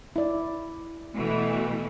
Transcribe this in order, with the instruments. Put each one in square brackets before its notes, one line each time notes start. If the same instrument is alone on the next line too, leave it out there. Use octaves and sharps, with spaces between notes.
[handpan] E4 D5
[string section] B2 E3 A3